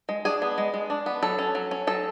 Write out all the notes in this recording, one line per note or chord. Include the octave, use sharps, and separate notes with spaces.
G#3
D4 G#4
B3
G#3
G#3
D4
B3
F#3 A4
C#4
F#3
C#4
F#3 A4